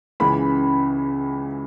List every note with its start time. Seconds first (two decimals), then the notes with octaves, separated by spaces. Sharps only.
0.20 C#2 C#3 E3 B5